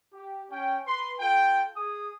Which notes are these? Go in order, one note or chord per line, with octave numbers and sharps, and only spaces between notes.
G4
C#4 G5
B4 C6
F4 A4 G5
G#4 D#6